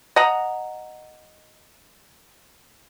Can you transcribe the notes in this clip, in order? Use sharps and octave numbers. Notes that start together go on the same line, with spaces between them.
D#5 F#5 A#5